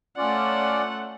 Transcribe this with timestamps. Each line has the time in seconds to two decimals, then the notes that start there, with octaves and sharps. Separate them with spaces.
0.17 A3 C#4 F4 D5 F#5